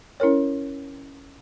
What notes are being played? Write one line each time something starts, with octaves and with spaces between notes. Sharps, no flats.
C#4 E4 A#4 C#5